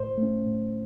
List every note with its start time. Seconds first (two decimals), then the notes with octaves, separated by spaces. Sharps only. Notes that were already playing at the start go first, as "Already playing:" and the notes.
Already playing: A2 C5
0.18 A3
0.23 C#4
0.46 A2